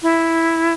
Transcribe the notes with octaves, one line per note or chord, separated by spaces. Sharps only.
E4